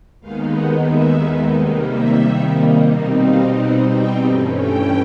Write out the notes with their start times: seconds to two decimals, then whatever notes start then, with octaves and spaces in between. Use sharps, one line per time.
0.20 D#2 D#3 G#3 B3 D#4 F5
0.54 F#5
0.87 E5
1.54 C3 D#3 G3 A#3 D#4
1.89 E5
2.90 B2 G3 C4 D#4
3.23 F5
3.57 F#5
3.90 G5
4.25 G2 E3 A3 C#4
4.59 G5